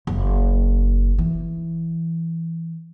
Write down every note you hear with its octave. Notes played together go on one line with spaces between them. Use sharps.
F#1
E3